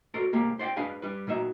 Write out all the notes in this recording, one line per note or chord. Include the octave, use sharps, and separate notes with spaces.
F#4 A4 A#4 C5 D5
C2 A#3 G4 G#4
C5 D5 F#5 G5
D4 G#4 B4 F5 G#5
G3 B4
A#2 F#3 D#4 E5